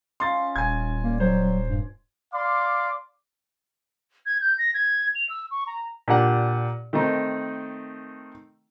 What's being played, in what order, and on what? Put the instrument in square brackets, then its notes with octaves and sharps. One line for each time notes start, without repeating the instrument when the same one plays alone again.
[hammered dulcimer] C#4 D#4 F4 [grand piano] C6 A6
[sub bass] D#1 [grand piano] G#5 G#6
[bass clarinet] A#3 [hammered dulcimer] D5
[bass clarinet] F#3 [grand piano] C5
[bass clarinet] G2
[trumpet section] D5 F5 C6 D6
[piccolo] G#6
G6
A#6
G#6
F7
E6
C#6
A#5
[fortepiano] A#2 D4 G4 F#5
D#3 A3 C4 D#4